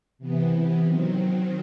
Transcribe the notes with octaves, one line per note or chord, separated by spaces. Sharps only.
C3 E3 B3
D#3 F#3 C4